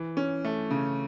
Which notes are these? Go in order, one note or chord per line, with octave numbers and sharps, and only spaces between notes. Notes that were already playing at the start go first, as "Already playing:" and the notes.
Already playing: E3
C#4
A3
C#3